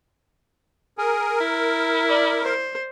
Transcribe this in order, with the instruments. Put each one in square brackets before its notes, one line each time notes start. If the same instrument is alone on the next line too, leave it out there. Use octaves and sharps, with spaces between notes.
[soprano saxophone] G#4 [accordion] A#4
[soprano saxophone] E4
[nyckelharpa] D5
C5